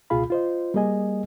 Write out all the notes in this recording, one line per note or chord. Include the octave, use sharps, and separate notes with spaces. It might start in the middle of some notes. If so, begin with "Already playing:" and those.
C#2 B2 F4 G#4 F5 B5
F4 C5 D#5
G3 A#3 G#4 D#5 G#5